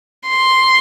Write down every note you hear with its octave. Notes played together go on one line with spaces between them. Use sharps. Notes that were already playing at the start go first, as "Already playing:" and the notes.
C6